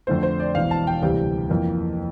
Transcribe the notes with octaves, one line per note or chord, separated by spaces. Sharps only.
F2 D3 A3 C5
C5
D5
E1 E2 E3 F5
A5
G5
D2 C3 E3 G3 G5
F2 E3 A#3